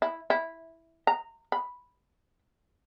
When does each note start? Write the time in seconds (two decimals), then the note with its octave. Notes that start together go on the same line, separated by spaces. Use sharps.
0.02 E4
0.30 E4
1.07 A#5
1.52 B5